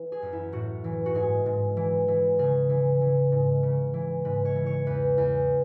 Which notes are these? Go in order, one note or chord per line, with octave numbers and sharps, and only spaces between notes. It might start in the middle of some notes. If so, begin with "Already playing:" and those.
Already playing: E3
G#4
F#2
E4
A2 F#4
E3
F#4
G#2 G#4
G#2
E3
E3
C#3 G#4
E3
E3
G#2
C#3
E3
G#2 B4
C#5
E3
C#5
E2 B4
E2